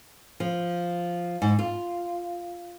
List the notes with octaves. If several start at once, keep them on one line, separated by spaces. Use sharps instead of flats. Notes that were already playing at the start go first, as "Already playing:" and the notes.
F3
G#2
F4